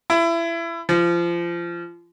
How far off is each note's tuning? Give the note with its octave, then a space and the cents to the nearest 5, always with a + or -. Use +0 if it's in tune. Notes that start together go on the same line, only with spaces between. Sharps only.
E4 +25
F3 -25